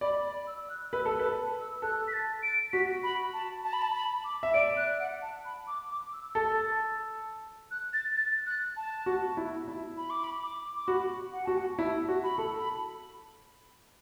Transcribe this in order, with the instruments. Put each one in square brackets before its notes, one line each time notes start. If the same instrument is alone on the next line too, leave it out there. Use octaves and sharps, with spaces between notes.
[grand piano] D5 [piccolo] B5
[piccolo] B5
E6
E6
F#6
[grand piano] B4 [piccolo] E6
[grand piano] A4
[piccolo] A5
[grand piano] B4
[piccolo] E6
[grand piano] A4 [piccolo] F#6
[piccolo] B6
A6
D7
[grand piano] F#4 [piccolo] B6
[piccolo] B5
A5
A5
B5
A5
B5
D6
[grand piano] E5
[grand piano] D5 [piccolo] D7
[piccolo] F#6
F#5
A5
B5
D6
D6
E6
[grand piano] A4 [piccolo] A6
[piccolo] F#6
A6
A6
F#6
A5
[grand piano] F#4
E4
E4
[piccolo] B5
D6
B5
D6
D6
[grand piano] F#4 [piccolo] B5
[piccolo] F#5
[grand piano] F#4 [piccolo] A5
[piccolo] F#5
[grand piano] E4 [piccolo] A5
[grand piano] F#4
[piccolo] B5
[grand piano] A4
[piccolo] B5